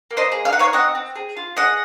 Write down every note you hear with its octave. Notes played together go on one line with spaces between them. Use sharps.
A#3
C5 D#5
G#4
F5
D#4 F#5
C#5 F5
C4 D#5 F#5
C4
G#4
F4
G#4 D#5 F#5